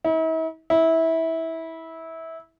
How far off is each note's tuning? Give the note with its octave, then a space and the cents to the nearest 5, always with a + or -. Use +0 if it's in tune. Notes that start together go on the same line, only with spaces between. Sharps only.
E4 -45
E4 -20